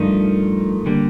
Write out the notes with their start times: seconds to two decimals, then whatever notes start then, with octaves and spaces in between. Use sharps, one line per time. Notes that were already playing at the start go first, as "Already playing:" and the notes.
Already playing: G2 F3 A3 D#4 A#4
0.86 D3 G3 A#3